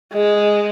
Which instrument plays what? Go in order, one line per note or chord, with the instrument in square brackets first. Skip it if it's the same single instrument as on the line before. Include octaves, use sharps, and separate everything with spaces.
[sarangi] G#3